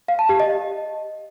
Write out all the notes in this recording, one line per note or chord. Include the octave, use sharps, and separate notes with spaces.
F5
A5
G4
D#5